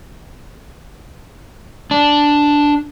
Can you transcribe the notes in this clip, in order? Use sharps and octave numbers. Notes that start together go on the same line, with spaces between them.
D4